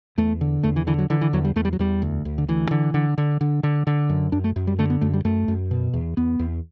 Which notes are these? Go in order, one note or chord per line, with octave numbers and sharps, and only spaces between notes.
E2 A3
D3
E2 A3
E3
D3 E3
F#3
D3 E3
E3
E2 F#3
G3
E2 A3
G3
F#3
E2 G3
D2
D2
D3
D2 E3
D3
D3
D3
D3
D3
D3
F#2
F#2 D4
A3
F#2
G3
D3 A3
B3
F#2 A3
G3
F#2 A3
F#2
B2
E2
E2 B3
E2